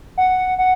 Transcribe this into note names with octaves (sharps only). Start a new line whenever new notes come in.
F#5
F#5